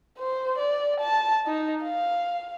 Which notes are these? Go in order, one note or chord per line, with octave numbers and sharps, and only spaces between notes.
C5
D5
A5
D#4
F5